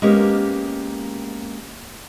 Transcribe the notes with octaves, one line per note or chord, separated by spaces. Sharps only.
G#3 A#3 B3 C#4 G4 A#4